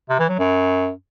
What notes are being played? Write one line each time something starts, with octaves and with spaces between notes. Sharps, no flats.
C3
E3
F#3
F#2